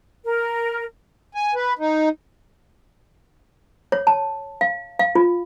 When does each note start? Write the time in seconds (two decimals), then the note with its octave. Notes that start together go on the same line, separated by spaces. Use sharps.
0.24 A#4
1.35 G#5
1.55 B4
1.79 D#4
3.92 C#5
4.07 A5
4.61 F5
4.99 F5
5.15 F4